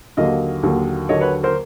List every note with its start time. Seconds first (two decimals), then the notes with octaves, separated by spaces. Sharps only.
0.17 D#2 D3 F#3 A#3 D#5 F5
0.63 D#2 D3 F#3 A#3
1.09 D#2 D3 F#3 A#3 C#5 D#5
1.21 B4 C#5
1.43 A#4 C5